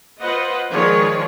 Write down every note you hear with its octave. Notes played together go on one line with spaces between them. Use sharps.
F4 B4 C5 D#5 F#5
D#3 F3 G#3 G#4 C#5 D5